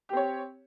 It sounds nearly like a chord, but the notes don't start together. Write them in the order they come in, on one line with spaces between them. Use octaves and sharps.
G4 C4 C#5